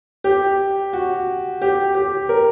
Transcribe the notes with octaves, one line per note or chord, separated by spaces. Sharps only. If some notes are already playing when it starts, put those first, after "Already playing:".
G4
F#4
G4
G4
A#4